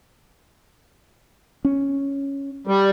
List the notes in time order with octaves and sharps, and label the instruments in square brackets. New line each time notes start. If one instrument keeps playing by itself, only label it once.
[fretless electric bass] C#4
[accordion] G3